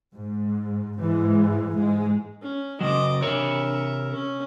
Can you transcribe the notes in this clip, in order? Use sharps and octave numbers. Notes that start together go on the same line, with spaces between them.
G#2
G#2 E3 G#3
G#2 G#3
C#4
C#3 F#3 D#5 D6
C3 A#4 C#5 E5
C#4